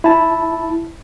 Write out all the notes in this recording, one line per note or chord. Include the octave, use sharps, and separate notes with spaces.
E4 A5